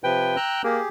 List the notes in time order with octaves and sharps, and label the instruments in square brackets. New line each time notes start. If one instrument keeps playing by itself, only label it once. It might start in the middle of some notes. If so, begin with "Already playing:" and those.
[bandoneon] C3 F3 B4 [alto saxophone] G5
[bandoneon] A#5 E6 F#6
[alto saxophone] A#3 [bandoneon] G4 G#4